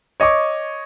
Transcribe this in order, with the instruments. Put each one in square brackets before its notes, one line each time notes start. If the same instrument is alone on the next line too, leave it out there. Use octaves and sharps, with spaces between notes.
[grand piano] C#5 D#5 C#6 D6